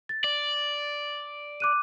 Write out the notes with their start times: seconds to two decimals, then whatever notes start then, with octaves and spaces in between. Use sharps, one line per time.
0.09 A6
0.24 D5
1.60 D6 F#6 D#7